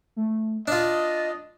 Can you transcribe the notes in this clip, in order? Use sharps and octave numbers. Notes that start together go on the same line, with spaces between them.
A3
D4 F4 D#5 A6